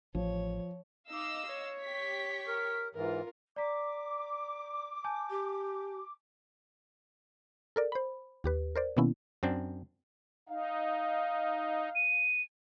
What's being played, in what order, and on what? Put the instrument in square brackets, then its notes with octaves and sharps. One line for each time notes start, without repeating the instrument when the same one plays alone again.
[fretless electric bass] A1 [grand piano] F3 [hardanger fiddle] C#5
[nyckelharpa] D#4 D6 [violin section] D#5 F5 E6
[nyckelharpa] C#5
[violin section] G4 C#6 B6
[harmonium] A#4
[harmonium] G#2 E3 [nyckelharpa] F4 A#4
[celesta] D5 A#5 B6 [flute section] D6
[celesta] G#5 A5 G6
[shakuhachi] G4
[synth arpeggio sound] A4 A#4 D5
C5 B5
D#2 G4 B4
A#4 C5 D5
B2 D#3 A#3 B3 C#4 E4
[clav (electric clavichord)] F#2 C4 D4
[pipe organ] D#4 [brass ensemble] F5
[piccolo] D#7